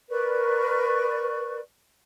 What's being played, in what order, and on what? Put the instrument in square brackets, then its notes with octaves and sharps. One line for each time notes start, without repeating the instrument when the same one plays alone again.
[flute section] A#4 B4 D5 C#6